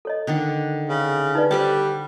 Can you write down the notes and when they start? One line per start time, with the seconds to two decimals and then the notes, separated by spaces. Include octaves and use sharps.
0.05 A4 C#5 D#5
0.27 D3 D#3 D4
0.89 C#3
1.35 D#4 B4 D5
1.51 G3 A4 B4 C5 D5 A5